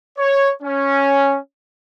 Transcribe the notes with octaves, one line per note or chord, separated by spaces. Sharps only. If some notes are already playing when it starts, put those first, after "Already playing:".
C#5
C#4